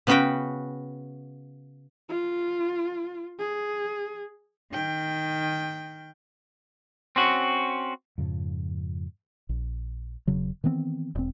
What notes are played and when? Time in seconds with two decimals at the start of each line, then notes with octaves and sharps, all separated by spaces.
0.07 C#3 B3 C#4 F#4 B4 G5
2.09 F4
3.39 G#4
4.72 D#3 G5
7.16 C4 C#4 F#4
8.18 F2 G#2 C#3 F3
9.49 A#1
10.27 E1 C#3 F#3
10.64 D#3 E3 B3 C4
11.15 E1 C4